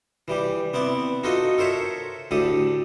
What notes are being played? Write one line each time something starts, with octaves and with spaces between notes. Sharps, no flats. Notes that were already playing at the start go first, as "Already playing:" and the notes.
E3 G3 G4
B3 C4 E4 D5
D#4 F4 F#4 A4 D#5
A4 A#4 C5 C#5 E5
D2 A2 G4 A4 D#6